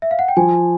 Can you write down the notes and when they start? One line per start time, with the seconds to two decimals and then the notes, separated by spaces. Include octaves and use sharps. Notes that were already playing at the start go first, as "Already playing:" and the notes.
0.02 E5
0.11 F5
0.19 F#5
0.28 G5
0.37 F3 G#5